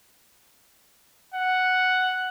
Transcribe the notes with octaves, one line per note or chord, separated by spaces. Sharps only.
F#5